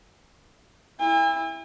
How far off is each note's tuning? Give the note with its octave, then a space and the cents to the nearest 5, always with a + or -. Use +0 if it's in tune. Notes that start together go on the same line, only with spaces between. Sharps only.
E4 +0 G#5 -45